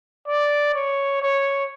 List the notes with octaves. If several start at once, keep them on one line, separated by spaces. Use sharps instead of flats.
D5
C#5
C#5